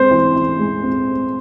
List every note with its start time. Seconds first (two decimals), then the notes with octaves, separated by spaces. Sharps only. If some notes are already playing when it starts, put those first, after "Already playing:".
Already playing: G#3 C4 C5
0.11 E3
0.36 E3
0.59 G#3
0.83 C4